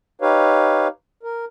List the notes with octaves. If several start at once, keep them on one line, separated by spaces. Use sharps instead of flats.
D#4 G4 B4 C#5 F5
A#4